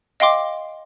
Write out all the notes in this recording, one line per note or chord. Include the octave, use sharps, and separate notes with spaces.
D#5 F5 G5 C6 D6